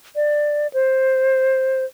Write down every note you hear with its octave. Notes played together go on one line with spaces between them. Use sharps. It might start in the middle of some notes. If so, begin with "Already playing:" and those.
D5
C5